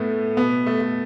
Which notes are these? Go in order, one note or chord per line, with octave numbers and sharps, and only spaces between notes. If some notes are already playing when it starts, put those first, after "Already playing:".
Already playing: A2 A3 B3
B2 B3
A3
A3